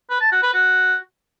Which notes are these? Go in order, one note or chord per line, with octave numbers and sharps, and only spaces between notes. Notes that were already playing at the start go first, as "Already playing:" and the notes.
B4
A5
F#4
B4
F#4